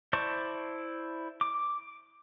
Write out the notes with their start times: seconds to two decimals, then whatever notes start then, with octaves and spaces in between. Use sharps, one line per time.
0.13 E4 C5 D5 A5 C#6
1.41 D6